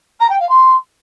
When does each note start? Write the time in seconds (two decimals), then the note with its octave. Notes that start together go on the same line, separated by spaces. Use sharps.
0.20 A#5
0.29 G5
0.39 F5
0.49 C6